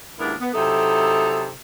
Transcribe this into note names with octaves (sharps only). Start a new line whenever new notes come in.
D#2 G#2 B3 D4 E4 A#4
B3
C3 F#3 D#4 E4 A4